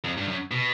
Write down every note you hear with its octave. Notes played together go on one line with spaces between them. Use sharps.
F2
G2
F#2
B2